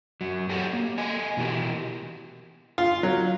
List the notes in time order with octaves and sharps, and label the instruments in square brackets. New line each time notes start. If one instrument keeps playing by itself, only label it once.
[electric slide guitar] F#2 F#3
G4 A4 A#4 C#5 F#5
A#3
A4 D#5 G#5
B2 E3 B3 G4 A#4
[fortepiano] F4
F#3